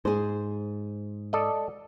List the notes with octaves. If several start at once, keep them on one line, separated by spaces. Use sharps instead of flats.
G#2 G#4 C5
A4 D5 D#5